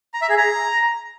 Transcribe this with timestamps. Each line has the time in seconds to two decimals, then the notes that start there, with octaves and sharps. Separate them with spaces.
0.14 A#5
0.22 E5
0.29 G#4
0.37 A#5